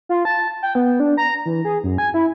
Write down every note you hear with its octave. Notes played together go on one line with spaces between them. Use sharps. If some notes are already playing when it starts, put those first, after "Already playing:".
F4
A5
G5
B3
D4
A#5
E3
G#4
F#2
G#5
E4